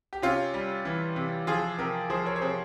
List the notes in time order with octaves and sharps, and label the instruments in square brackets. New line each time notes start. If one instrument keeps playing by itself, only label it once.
[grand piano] G4
C3 C#4 F4
G3
E3
C3
F3 F4 G#4
C3 G4 A#4
F3 G#4 C5
A#4 C#5
C#5
C3 G#4 C5